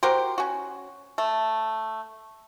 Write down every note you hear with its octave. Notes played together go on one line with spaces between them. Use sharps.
F#4 G4 A#4 C5
C#4 F#4
A3